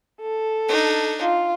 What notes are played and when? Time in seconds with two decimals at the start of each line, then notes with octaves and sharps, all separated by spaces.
0.21 A4
0.68 D4 D#4
1.22 F4